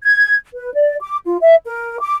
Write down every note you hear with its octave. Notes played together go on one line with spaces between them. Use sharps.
G#6
B4
D5
D6
F4
E5
A#4
D6